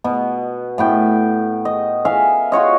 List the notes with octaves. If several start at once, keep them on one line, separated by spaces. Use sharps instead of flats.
B2 B3
A2 B3 G5
D#5
E5 F5 G#5
F4 F#4 C#5 D#5